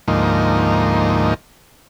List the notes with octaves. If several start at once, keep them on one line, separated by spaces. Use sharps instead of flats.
D2 G#2 F3 A#3 D#4